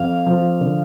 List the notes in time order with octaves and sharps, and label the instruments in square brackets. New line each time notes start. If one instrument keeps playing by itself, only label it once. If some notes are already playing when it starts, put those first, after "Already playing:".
Already playing: [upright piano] F2 [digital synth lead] F5
[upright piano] F3
D3